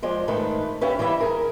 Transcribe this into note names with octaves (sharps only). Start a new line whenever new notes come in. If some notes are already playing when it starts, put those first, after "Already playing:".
F3 G#3 D5
G#2 D#3 A3 B4
C#4 G4 B4 E5 F5
E3 G3 E4 E5
G#4 A#4